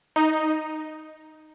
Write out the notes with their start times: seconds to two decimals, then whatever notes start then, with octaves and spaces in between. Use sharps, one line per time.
0.16 D#4